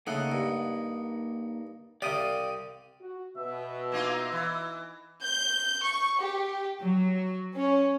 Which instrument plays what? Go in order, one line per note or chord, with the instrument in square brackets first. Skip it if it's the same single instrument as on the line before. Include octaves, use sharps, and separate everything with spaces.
[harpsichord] C#3 A3 [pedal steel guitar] A#3 D#4 F#5
[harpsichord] G2
[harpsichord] C2 C3 G4 [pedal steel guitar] D5 F5 D#6
[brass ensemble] F#4
[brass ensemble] B2 [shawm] E5
[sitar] A#3 D#4 F4
E3
[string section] G6
C#6
G4
F#3
C#4